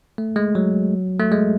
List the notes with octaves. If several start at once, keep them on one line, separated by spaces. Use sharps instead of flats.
A3
G#3
F#3
A3
G#3